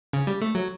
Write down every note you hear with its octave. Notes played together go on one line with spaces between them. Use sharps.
C#3
G3
A3
F#3